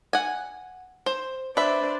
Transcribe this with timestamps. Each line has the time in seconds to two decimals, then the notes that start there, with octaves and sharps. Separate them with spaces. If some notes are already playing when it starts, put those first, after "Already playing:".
0.13 F#5 G#5
1.06 C5
1.57 D4 B4 C5 D5 E5